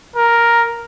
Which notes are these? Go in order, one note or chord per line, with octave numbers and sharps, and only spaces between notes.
A#4